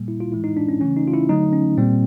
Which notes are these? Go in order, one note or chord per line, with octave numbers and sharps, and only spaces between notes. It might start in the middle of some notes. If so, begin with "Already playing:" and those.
Already playing: A#2 G3 A#3
E4
F4
A2 E3 G#3 E4
D#4
D4
C#4
C#3 E3 A3 C#4
D#4
F4
E4
D3 F#3 A3 D#4
C#4
A#2 G3 A#3 C4